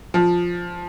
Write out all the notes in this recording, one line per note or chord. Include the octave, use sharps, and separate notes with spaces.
F3